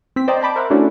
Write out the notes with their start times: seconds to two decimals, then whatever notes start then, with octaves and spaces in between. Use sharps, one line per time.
0.16 C4 B6
0.28 C5 D5 D#5 G5 A#5
0.42 G5 A5 B5 D6
0.56 A#4 C5 E5 F#5
0.70 A3 C#4 D4 E4 F#4